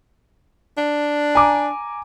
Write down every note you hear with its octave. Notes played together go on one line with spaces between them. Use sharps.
D4
G#5 A#5 D6